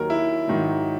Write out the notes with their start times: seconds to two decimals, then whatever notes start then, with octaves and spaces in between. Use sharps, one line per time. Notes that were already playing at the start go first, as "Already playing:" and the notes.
Already playing: D#2 D#3 F#3 A#4
0.10 E4
0.48 G#2 D#3 F#3